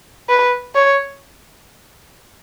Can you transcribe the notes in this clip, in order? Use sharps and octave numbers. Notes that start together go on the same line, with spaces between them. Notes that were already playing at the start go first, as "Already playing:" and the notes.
B4
C#5